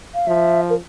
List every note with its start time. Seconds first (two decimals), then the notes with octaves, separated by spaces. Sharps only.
0.14 F5
0.27 F3 E5
0.70 A#4